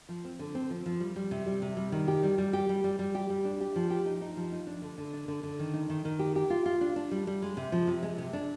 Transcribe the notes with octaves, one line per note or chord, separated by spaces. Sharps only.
F3
C4
D3
C4
F3
F3
G3
G3
C3
G3
C3
G3
D#3
G4
G3
G3
G4
G3
G3
G3
G4
G3
D4
G4
F3
G4
D#4
D#4
F3
D#4
D4
D3
D3
D4
D3
D3
D#3
D#4
D#3
D#3
G4
G4
F4
F4
D4
D4
G3
G3
G#3
C3
F3
C3
G#3
C3
D4